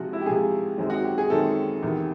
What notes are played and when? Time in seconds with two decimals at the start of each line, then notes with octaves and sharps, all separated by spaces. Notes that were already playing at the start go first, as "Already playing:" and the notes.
Already playing: C3 F3 G#3 F#4
0.13 E4
0.21 G4
0.26 C3 F3 G#3 G#4
0.78 F#2 D#3 G#3 C4
0.90 F#4
1.04 G4
1.18 G#4
1.30 F#2 D#3 G#3 C4 A4
1.83 E2 C3 D#3